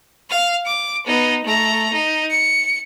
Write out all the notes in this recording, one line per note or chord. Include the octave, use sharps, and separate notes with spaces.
F5
D6
B3 D#4
A3 A#5
D#4
C#7